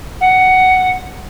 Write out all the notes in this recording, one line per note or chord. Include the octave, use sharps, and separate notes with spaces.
F#5